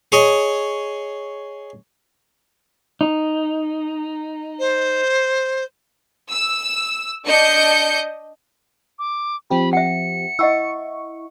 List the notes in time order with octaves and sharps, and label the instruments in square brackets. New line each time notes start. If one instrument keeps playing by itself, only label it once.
[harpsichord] G#4 C#5 D#5
[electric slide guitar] D#4
[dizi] C5
[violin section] E6
D4 D#5 G6 C#7
[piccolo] D6
[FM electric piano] F3 C4 G4 [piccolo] B5
[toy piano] E5 F#5 [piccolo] C#7
[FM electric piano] E4 C#6 [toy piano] D#5 F#5 E6